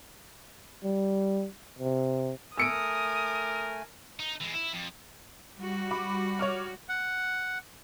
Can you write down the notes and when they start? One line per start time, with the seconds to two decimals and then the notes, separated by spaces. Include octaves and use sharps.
0.84 G3
1.79 C3
2.58 A3 A#4 G#5 D#6 E6 C#7 D7
4.19 D#4
4.41 E3 G#3
4.54 E4
4.73 F2
5.56 G3 F#4
5.91 B5 D6
6.39 C#5 D6 F6
6.89 F#5